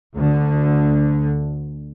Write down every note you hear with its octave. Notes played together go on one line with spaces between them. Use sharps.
D2 D3